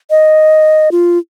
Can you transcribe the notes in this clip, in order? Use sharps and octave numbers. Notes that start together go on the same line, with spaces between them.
D#5
F4